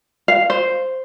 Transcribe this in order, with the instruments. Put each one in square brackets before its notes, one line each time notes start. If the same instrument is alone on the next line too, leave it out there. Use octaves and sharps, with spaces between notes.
[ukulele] F5
C5